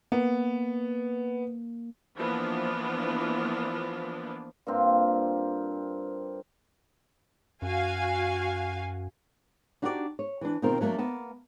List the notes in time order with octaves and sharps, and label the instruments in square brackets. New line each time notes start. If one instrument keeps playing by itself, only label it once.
[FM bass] A#3 [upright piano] B3
[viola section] E3 F3 A#3 B3 D4 F4
[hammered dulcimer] G2 A#3 C4 F4
[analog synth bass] F#2 [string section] F#4 F5 G#5
[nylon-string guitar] D4 D#4 F#4 G4 C5 D5
C#5
E3 D4
B2 D#3 C4 F4 A#4
F#3 A3 A#3 C#4 D4
A#3 B3 A5